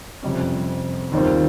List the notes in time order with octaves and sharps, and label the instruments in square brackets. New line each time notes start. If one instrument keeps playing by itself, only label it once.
[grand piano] F2 C3 G3 C#4
D#2 D#3 G3 C4 F4